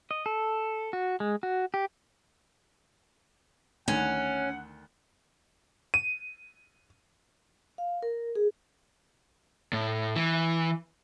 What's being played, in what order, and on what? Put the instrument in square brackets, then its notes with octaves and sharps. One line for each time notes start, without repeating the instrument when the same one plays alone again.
[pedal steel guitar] D#5
A4
F#4
G#3
F#4
G4
[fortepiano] D2 D#3 [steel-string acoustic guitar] C#4 [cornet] F#5
[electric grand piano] D#7
[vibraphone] F5
A#4
G#4
[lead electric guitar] A2
E3